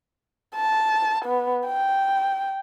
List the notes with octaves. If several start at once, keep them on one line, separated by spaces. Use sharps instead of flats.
A5
B3
G5